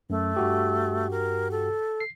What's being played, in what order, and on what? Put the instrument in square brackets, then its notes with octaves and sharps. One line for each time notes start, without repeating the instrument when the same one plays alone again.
[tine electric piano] F#2 [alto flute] A3
[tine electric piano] G2 F#4 G4
[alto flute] A#4
A4
[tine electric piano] C7